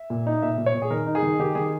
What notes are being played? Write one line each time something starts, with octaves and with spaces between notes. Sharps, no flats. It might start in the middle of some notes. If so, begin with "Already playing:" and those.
Already playing: E5
A#2
D#4
A#2 E5
A#2
C#5
A#2
G#4
D#3 A#4
D#4
G#4
D#3
D#3 G4
D#3 G#4